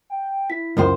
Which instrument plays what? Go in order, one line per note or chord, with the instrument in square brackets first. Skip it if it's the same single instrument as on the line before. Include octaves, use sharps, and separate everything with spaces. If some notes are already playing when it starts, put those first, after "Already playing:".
[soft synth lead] G5
[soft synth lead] E4 [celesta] B6
[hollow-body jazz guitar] C#2 F#2 C5 [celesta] A#4 C6